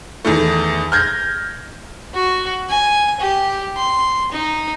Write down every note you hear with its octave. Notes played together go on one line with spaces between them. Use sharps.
E2 D#3 A3
F6 G6 G#6 A#6
F#4
G#5
G4
C6
D#4